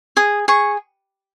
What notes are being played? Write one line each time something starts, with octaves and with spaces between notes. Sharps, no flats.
G#4 D#6
G#4 C#6